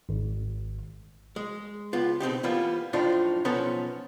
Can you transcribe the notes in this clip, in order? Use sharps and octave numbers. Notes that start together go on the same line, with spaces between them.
G#1
G#3
C#2 B3 F4
B2 C4 D#4 G4
E3 G3 A#3 B3 F4
F#2 A2 F3 D4 D#4 F4
B1 F3 B3 C#4 A4 A#5